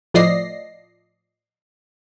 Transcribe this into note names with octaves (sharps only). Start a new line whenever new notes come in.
A2 F3 D5 D#5 A#6 C7